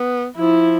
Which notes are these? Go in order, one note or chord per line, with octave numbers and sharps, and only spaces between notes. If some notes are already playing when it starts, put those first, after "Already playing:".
Already playing: B3
F3 E4